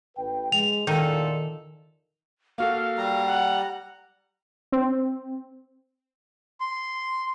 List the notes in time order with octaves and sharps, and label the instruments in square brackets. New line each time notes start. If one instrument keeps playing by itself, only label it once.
[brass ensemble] A1 B4 G5
[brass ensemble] G#3 [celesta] F7
[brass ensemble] E2 A#2 [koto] D#3 D#4 [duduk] A4
[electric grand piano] A#3 F#4 A4 [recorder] F5
[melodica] G3 A#5
[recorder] F#5
[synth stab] C4
[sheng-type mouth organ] C6